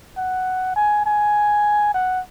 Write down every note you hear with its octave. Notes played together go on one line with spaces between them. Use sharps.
F#5
G#5
G#5
F#5